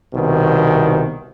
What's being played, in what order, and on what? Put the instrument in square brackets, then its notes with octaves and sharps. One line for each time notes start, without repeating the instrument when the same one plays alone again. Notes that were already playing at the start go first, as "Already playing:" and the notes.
[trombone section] C2 B2 D#3